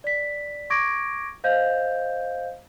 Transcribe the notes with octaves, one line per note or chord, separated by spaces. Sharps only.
D5 B6
C#6 D6 G#6 A#6 D7
C5 D#5 F5 G6